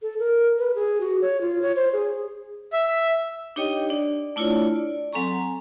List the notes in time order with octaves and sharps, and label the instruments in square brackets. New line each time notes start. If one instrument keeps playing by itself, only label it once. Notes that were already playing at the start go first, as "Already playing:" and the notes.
[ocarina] A4
A#4
B4
G#4
F#4
C#5
F4
C#5
C5
G#4
[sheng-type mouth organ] E5
[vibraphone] D4 D#4 G4 C#5 D#5 G5
D4 D5
A3 D4 E4 F4 C#5 D5
D5
F#3 C4 A4 G#5 A#5 C#6
G#5